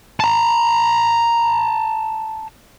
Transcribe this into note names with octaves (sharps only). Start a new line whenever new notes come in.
A5 A#5